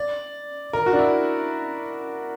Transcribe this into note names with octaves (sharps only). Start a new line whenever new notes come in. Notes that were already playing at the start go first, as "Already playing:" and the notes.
Already playing: D5
A#4
F#4
D4
E4